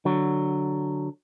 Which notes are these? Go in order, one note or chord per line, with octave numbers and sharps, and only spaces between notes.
D3 F#3